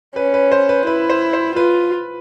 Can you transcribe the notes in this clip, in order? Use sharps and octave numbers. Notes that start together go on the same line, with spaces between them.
C#4 B4
B4
C5
B4
E4 B4
C5
C5
F4 B4